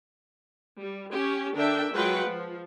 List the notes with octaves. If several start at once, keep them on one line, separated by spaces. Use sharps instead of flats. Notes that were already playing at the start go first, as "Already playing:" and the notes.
G3
C#4 G4
D3 D4 A#4 E5 G5
F#3 G#3 F4 B4 F#5 G5
F3